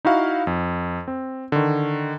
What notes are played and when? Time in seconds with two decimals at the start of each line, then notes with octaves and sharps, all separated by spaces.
0.05 D#4 E4 F#4 F5
0.47 F2
1.08 C4
1.52 D3 D#3